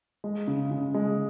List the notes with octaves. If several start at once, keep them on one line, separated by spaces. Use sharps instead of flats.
G#3
C#3
C#3
G#3